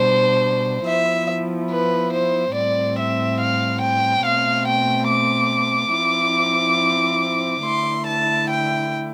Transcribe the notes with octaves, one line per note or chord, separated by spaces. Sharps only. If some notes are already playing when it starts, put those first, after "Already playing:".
Already playing: B2 G3 D4 C5
F3 B3 E4 E5
B4
C5
A2 G3 C4 D5
E5
F5
G5
B2 A3 C4 F5
G5
D6
F3 C4 E4
D3 A3 E4 C6
A5
G5